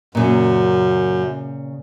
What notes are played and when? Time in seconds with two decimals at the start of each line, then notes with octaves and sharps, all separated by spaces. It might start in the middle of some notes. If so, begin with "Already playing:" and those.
0.15 F#2 A#2 C#3